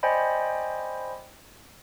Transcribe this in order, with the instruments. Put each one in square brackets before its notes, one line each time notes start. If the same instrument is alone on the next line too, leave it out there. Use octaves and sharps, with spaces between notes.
[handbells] C5 D5 D#5 G5 G#5 B5